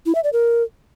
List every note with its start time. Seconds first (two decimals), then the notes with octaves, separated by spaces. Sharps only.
0.06 E4
0.15 E5
0.24 D5
0.33 A#4